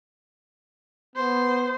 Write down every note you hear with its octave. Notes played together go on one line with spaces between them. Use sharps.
B3 C5